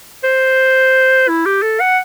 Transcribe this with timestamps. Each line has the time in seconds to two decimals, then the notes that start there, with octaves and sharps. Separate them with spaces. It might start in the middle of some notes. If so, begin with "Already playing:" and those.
0.24 C5
1.28 E4
1.46 G4
1.63 A4
1.80 F#5